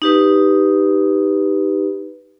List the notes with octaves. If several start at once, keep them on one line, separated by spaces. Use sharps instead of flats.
D#4 G4 B4